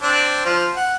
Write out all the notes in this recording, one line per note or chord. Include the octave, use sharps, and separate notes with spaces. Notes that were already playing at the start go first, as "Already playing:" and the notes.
C4 D4
F3 C5 F6
F#5